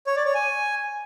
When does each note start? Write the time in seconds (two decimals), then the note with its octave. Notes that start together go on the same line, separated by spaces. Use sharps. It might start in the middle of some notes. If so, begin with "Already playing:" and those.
0.07 C#5
0.16 D5
0.25 C#5
0.34 G#5